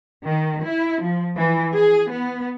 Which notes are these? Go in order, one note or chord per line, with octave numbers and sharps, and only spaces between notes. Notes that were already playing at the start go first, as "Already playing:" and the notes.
D#3
E4
F3
E3
G#4
B3